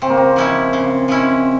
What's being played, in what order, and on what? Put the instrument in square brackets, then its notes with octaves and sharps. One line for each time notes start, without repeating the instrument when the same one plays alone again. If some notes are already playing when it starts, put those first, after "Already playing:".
[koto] C#3 [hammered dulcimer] C4
[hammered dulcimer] A#3
C4
[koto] F3 G#3 C#4 E4
C#3
F3 G#3 C#4 E4